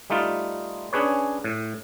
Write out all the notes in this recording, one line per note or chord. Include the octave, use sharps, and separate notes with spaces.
G3 A3 D#4 F4
C#4 D4 G#4 B4 C#5
A2